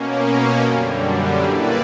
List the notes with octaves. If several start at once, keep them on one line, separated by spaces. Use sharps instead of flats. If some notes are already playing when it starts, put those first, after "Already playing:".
Already playing: B2 A#3 C#4
F#2 D3 G3
A#2 A#3 E4 B4 D5